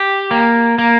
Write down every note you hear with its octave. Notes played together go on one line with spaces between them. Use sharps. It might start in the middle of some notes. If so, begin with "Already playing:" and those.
Already playing: G4
A#3
A#3